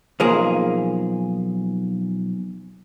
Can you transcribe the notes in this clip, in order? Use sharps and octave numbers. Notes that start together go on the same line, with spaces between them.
B1 F3 A#3 G#4